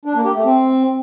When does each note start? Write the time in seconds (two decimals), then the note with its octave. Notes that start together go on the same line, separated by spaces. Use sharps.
0.05 D4
0.15 A#3
0.25 G4
0.35 A3
0.44 C4